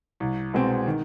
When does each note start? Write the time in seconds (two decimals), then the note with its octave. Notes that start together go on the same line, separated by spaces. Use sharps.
0.20 C2
0.53 B2 G#3 C4
0.87 D#3